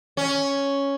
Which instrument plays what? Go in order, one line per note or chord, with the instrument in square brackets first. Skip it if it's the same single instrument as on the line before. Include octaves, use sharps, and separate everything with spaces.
[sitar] C#4